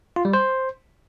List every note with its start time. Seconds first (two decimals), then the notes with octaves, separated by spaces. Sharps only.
0.16 F4
0.25 G3
0.33 C5